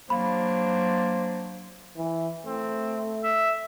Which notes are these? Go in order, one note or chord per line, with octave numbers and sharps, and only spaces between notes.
F#3 A#3 D4 C5 B5
E3
A3 C4
E5